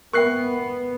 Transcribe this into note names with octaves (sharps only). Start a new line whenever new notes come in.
B3 A#4 E5 G5 C#6 F#6 C7